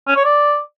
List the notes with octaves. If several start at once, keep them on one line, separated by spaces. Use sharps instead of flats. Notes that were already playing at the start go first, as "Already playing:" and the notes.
C#4
C#5
D5